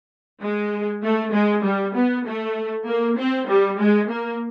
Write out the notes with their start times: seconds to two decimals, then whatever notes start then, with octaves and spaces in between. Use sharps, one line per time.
0.42 G#3
1.03 A3
1.33 G#3
1.64 G3
1.95 B3
2.26 A3
2.87 A#3
3.18 C4
3.49 G3
3.80 G#3
4.11 A#3